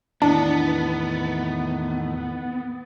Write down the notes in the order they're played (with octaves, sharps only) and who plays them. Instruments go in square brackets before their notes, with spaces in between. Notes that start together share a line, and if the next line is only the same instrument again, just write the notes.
[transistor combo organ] E2 A2 D#3 [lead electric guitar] B3 [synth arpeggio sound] D4 [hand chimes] E4